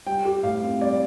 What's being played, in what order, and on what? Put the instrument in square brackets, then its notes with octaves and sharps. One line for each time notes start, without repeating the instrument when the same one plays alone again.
[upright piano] G3 [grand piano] G5
[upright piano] G4
[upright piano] A2 [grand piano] F5
[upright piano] C4
[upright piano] G3 [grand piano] D5